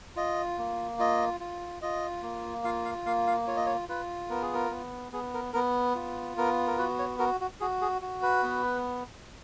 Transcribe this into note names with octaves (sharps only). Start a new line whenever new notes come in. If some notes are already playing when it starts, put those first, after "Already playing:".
F4 D#5
A#3
F4 D#5
F4
F4 D#5
A#3
F4 F5
F5
A#3 F5
F5
F4 C#5
D#5
C#5
F4 B4
B3 A#4
G#4
A#4
B3
B3 G#4
A#4
B3 A#4
F4
B3 A#4
A#4
F#4 B4
C#5
F#4 A#4
F#4
F#4 G#4
G#4
F#4
B4
B3